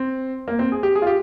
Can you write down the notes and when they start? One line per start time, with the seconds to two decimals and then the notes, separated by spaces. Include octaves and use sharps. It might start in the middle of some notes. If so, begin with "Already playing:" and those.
Already playing: C4
0.48 A#3
0.59 C4
0.72 G#4
0.83 G4
0.95 G#4
1.02 F4
1.07 G4